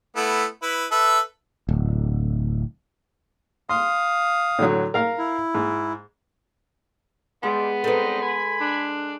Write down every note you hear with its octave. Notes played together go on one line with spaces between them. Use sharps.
A3 B3 E4
E4 B4
A4 B4 E5
D1
F5 C6 D#6
A2 D3 F#3
A#4 F5 F6
E4
G#2
G3 G#3 B3
G3 C4 D#4 A4 B4
G#5 B5
D4